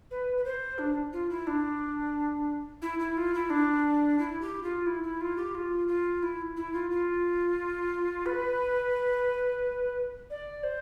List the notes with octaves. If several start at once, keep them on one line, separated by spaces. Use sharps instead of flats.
B4
B4
C5
D4
F4
E4
D4
E4
E4
F4
E4
D4
E4
G4
F4
E4
E4
F4
G4
F4
F4
E4
E4
F4
F4
B4
D5
C5